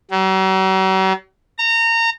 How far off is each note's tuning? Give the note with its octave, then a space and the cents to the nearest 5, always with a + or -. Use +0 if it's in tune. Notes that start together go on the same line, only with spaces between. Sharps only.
F#3 +45
A#5 -25